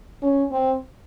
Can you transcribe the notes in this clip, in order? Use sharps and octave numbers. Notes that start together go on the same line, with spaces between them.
C#4
C4